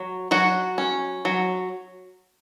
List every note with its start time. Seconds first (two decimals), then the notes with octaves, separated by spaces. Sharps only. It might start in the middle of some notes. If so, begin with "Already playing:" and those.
Already playing: F#3
0.31 F#3 F#4
0.78 C#4
1.25 F#3